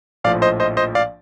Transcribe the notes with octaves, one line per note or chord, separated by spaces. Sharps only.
A#1 A2 F3 D5 F5
C5 D#5
C5 D#5
C5 D#5
D5 F5